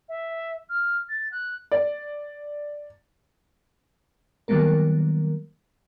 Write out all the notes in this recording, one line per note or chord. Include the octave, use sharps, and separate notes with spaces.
E5
F6
A6
F#6
D5
D#3 F#3 G3 A#3 B3 A#4